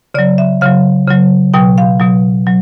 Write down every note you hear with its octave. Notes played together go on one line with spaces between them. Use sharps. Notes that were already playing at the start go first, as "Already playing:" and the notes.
C#3 F#3 D5
E5
C#3 F#3 F5
C#3 F#3
B2 F#3 G5
F5
B2 F#3
F#3